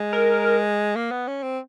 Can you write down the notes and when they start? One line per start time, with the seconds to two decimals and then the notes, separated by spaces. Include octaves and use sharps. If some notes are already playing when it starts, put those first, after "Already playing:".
Already playing: G#3
0.13 A#4
0.96 A#3
1.11 B3
1.27 C#4
1.43 C4